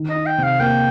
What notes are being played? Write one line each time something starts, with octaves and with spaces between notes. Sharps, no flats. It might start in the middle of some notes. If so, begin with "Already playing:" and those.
Already playing: D#3
D#5
D#4
G5
C3
F5
A#3 G5